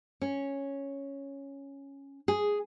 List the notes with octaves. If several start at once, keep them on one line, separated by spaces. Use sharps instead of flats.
C#4
G#4